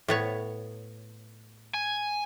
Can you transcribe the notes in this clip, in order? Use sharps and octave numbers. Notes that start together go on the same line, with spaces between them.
A2 B3 C#5
G#5